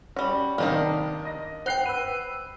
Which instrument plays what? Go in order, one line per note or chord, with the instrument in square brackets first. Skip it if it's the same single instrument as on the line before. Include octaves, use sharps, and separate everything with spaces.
[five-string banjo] G3 F#4 [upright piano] C#4
[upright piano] F1 D#3 [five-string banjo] A#3 D4 D#4
[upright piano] D#5 A#6
[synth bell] C5 G5 [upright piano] F#5 F#6 C7
[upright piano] B4 [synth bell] E6 D#7